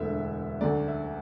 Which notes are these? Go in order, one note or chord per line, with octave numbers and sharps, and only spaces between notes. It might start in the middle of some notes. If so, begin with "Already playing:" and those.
Already playing: E1 D2 D3 E5
D2 D3 F#3 A3 D5
E5